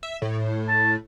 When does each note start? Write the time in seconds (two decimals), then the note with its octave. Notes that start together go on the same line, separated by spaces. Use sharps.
0.03 E5
0.22 A2
0.68 A5